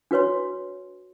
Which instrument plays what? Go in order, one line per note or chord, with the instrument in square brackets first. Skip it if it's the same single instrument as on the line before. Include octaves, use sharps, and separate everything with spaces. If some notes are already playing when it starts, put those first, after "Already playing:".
[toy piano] D4 F#4 B4 C#5 C6